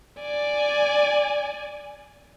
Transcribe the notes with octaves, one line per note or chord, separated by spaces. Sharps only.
D5 G#5